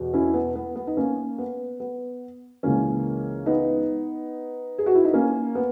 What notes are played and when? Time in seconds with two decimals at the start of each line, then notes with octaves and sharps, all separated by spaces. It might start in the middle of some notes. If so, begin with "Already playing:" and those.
Already playing: E2 B2
0.13 C#4 E4
0.34 B3
0.55 B3
0.76 B3
0.87 D#4
0.97 A#3 C#4
1.38 B3
1.80 B3
2.63 C#2 C#3 E3 A#3 C#4
3.46 B3 D#4
4.78 G#4
4.86 F#4
4.95 E4
5.05 D#4
5.13 A#3 C#4
5.55 B3